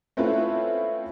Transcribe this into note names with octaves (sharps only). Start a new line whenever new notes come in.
A3 C4 C#4 E4 F4 B4